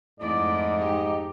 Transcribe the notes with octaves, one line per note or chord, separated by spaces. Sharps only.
F2 G#2 A3 E4 D5 D#5
D#4 G4